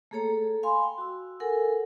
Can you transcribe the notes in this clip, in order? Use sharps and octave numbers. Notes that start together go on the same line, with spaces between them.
A3 A#3 G#4 A4 C#5 A#5
A4
F5 G#5 B5 C6
G5
F#4 E6
A4 A#4 F#5 G#5